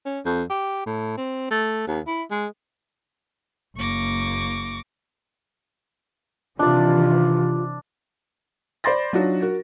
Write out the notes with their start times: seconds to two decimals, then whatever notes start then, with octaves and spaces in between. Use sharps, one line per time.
0.05 C#4
0.25 F2
0.50 G4
0.86 A2
1.17 C4
1.51 A3
1.87 D#2
2.07 E4
2.30 G#3
3.76 F#1 A#3 C#6 D6 A#6
6.59 C3 D#3 E3 D4 F4 D5
8.84 C5 D5 B5 C6 A6 A#6
9.13 F#3 D4 D#4 F4 F#4 C#5
9.42 F#4 A#4